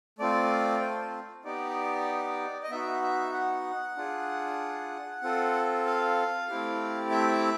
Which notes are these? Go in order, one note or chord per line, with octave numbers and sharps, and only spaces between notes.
A3 C4 F4 D5
C5
B3 D#4 G4 D5
D#5
B3 D#4 F#4 E5
E5
F#5
D4 F4 G#4
C4 F4 A4
F5
A3 C4 E4 G4
E5